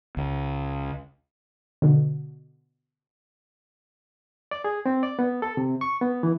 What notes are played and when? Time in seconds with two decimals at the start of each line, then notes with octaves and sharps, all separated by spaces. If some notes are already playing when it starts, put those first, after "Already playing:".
0.17 C#2
1.82 B2 D3
4.51 D5
4.64 G#4
4.86 C4
5.03 D5
5.19 B3
5.42 A4
5.57 C3
5.81 C#6
6.01 B3
6.23 E3